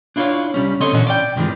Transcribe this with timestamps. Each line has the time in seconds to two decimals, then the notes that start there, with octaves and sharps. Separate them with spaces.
0.16 D4 E4 F4 G#4 C#5 F5
0.54 C2 G3 C#4
0.80 C#3 C4 A4 C#5 D#5 C6
0.93 A#2 D3 E3 C#4 F#4
1.07 D5 F5 G5
1.36 G2 C3 D#3 E3 G#3 F4